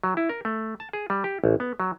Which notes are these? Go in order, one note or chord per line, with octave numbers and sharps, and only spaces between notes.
F#3
E4
A#4
A3
A5
G#4
G3
G4
A1
B3
F#3